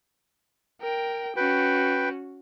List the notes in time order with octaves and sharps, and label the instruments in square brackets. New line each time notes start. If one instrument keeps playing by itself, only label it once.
[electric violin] A#4 G5
[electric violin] C#4 F#4 [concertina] B4 G5